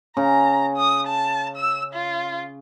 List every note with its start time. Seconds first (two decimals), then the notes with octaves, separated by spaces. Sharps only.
0.17 C#3 A#5
0.77 D#6
1.07 A5
1.56 E6
1.93 F4